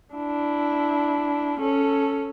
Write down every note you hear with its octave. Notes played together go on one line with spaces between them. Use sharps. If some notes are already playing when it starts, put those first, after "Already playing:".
D4 E4
C#4 A4